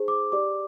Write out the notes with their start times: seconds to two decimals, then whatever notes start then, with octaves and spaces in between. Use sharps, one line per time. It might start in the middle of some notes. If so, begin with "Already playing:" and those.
Already playing: D#4 G#4 C5
0.08 D6
0.32 G4 D5 D6